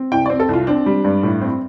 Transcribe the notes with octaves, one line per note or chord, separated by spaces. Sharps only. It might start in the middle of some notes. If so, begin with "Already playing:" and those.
Already playing: C4
C2 G5
C4 D5
A4
C2 F4
C4 D4
G3
G2
A2
C4